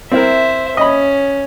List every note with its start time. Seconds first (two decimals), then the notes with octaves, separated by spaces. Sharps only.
0.11 C4 E4 A#4 C5 E5
0.77 C#4 D#5 B5